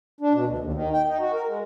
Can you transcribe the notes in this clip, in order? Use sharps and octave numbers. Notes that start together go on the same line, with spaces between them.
D4
B2
D2
D#2
D#3
G5
D#4
F#4
A#4
G#3